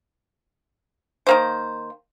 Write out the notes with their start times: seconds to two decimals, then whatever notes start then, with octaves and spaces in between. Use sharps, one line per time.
1.27 D#3 A#3 C5